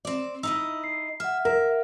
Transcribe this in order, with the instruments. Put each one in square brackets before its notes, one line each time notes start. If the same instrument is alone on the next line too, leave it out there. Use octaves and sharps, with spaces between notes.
[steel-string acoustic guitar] C4 D5
[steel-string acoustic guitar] D#4 E4 D#5 [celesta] E6
[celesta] C7
[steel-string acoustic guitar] E5 [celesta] F#5 F6
[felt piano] A#4 [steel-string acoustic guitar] E5